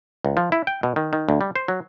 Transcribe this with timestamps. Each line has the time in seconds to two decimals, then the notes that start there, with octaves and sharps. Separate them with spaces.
0.25 C#2
0.37 F3
0.52 E4
0.67 G5
0.83 B2
0.96 D#3
1.13 D#3
1.29 D2
1.41 G3
1.56 C5
1.68 F#3